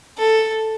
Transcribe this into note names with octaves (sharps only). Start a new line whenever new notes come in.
A4